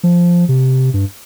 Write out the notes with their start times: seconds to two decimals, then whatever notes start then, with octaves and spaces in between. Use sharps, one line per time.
0.03 F3
0.49 C3
0.94 G2